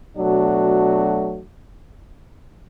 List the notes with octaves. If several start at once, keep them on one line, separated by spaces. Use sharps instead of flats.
B2 F#3 A3 D4 F#4